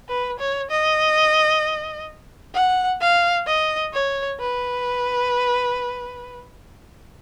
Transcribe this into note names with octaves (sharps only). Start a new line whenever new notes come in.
B4
C#5
D#5
F#5
F5
D#5
C#5
B4